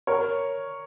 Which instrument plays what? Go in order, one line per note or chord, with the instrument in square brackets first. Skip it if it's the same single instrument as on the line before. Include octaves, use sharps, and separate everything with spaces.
[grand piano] A#4 C#5